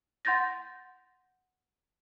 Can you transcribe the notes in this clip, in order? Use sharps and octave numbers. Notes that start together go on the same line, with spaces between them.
F#5 C6 G6 A6 A#6